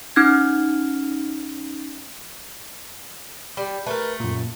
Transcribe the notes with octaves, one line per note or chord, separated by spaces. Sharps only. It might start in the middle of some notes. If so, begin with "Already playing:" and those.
C#4 D#4 F6 G#6
G3 B5
A3 A#4 B4
F#2 A#2